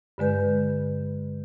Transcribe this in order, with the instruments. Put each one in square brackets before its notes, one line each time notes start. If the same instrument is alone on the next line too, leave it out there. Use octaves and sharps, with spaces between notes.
[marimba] G2 D3 G#3 B4 G6